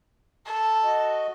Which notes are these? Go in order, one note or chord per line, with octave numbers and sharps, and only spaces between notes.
A4
F#4 D#5